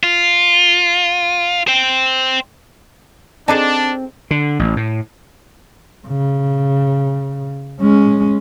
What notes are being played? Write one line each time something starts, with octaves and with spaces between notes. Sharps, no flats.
F4
C5 G5
C4 D4 D#4 G#4 A4 D5 A5
D3
A1
A2
C#3
G#3 C#4